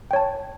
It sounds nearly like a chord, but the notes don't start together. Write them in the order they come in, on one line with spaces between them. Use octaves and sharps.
G5 C#5 A5